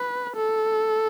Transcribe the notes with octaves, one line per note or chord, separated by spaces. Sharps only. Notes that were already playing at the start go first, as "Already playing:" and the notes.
Already playing: B4
A4